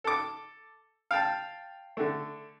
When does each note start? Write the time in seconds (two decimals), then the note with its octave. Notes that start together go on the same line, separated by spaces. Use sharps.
0.04 A4 D6
1.11 F5 G5 A5
1.97 D3 A3